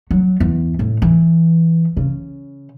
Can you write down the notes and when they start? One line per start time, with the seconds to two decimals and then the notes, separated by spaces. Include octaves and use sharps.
0.11 F#3
0.40 E2
0.79 A2
1.02 E3
1.97 C#3